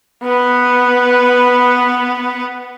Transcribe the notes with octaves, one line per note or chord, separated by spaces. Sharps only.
B3 B4